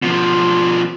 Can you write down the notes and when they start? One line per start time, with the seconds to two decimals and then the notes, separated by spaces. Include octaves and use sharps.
0.03 B2 F3